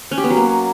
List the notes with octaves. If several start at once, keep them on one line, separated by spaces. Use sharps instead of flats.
C#4
G4
B3
F#3
A#3